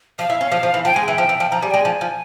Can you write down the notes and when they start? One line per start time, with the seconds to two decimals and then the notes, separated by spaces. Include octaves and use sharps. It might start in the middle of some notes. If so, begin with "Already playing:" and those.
0.19 F3 F5
0.30 E4
0.41 C#4
0.52 F3
0.63 F3
0.74 E3
0.85 F3 G5
0.94 G#3 G#5
1.04 E3 G5
1.18 F3
1.29 E3
1.40 F3
1.51 F3 A#5
1.61 G3 G#5
1.71 G#3 G5
1.81 F3 G#5
2.01 F3